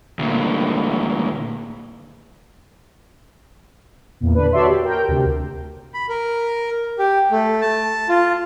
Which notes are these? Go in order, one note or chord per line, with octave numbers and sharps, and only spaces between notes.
D2 A#2
E2 A#2
D3 D4 B4
F#4 A4 C#5 D5 E5 C6
G4
A#4 G5
D2 C3
B5
A#4
G4
A3
A5
F4